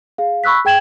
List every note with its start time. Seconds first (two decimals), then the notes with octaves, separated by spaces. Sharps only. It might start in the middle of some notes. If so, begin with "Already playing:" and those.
0.18 G#4 F5
0.44 B5 C#6 E6 F#6 B6
0.65 G#4 G5 G#6 E7 F#7